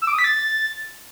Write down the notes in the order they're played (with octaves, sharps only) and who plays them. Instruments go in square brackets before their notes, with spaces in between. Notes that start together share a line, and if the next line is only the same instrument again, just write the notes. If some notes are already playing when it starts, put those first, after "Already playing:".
[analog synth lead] E6
D6
D#6
B6
A6